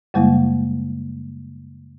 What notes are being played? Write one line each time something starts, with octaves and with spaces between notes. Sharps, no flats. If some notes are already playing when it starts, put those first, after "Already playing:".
F#2 C#3 G3 G#3 A#3 E4